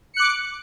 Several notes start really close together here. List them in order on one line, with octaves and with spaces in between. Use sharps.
C#7 F#6 D6